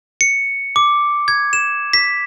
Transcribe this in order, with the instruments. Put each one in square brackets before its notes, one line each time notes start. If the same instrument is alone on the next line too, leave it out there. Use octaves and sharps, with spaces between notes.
[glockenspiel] C#7
D6
G#6
E7
B6